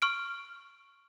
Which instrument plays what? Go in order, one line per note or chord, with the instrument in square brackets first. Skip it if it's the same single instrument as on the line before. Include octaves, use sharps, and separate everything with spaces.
[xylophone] C#6 F6 D7